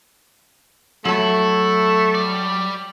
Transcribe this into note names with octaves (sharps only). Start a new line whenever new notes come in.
F#3 A3 E4 A5
G3 D5